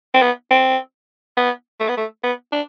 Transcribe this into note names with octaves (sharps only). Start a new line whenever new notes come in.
C4
B3
C4
B3
A3
B3
A3
B3
D4